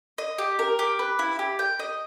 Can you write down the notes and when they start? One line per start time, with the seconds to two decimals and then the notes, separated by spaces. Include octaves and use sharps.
0.18 D#5
0.38 G4
0.59 A#4
0.79 G4
0.99 B4
1.19 E4
1.39 G4
1.59 G5
1.79 D#5